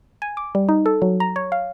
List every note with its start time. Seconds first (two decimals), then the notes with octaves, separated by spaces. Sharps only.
0.22 G#5
0.37 D6
0.55 G3
0.69 D#4
0.86 A4
1.02 F#3
1.20 A#5
1.36 C#5
1.52 F5